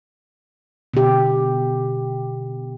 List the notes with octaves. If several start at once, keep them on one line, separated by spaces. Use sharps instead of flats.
B2 D3 G4